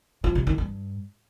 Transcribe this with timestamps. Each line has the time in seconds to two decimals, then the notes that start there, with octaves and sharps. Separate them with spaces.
0.24 F3
0.35 C3
0.47 D#3
0.58 G2